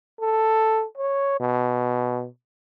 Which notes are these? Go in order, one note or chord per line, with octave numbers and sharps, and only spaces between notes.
A4
C#5
B2